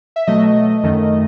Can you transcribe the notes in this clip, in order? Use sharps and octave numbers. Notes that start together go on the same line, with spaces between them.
E5
B2 F#3 A3 D#5
F#2 D#3 A3